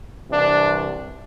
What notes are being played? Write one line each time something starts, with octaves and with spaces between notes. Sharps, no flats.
C2 C3 E3 D4